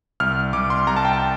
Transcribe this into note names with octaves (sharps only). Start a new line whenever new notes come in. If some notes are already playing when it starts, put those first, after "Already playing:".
C2 F6
C2 D6
C6
C2 A#5
A5
G5
A5